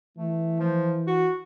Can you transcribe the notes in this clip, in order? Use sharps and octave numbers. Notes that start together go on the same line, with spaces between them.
E3 A3
F3
F#4